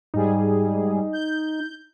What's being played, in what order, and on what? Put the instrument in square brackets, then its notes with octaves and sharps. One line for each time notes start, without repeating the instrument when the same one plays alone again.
[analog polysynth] G#2 G3 G#4 [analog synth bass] D#4
[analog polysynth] G6